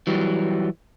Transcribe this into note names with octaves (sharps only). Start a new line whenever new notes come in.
E3 F#3 G3